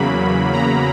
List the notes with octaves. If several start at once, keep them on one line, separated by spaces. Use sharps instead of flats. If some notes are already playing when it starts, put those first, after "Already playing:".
Already playing: E2 C#3 F#3 A#3 B5
A#5